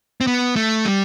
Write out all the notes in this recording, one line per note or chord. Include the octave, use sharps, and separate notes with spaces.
C4
B3
A3
G3